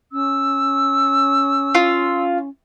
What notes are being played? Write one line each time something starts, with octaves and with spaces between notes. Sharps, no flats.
C#4 E6
F4